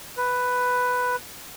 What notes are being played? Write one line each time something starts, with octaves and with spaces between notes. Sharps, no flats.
B4